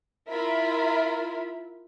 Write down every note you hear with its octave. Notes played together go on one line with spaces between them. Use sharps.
E4 F4 A#4 E5 B5